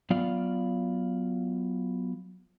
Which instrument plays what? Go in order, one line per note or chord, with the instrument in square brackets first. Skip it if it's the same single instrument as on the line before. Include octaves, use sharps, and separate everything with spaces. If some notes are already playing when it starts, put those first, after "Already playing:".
[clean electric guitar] F#3 B3 F4 D5 F5